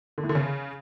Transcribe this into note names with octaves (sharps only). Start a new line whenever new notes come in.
D3
A2
D3
C#3